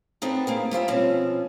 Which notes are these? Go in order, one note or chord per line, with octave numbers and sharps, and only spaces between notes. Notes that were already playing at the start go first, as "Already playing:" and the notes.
B3 C4 D4 D#4 A4
A#3 C4 G#4
G3 F4 C5 E5
B2 F3 C4 C#4